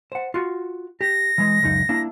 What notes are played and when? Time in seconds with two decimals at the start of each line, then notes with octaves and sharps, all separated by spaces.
0.12 C5 F#5
0.34 F4 F#4
1.01 G4 A#6
1.38 E3 G#3
1.63 C#2 F#2 D#4
1.89 A#3 D4 E4